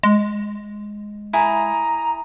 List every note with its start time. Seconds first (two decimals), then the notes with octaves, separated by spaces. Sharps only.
0.03 G#3
1.33 E4 G#4 A#5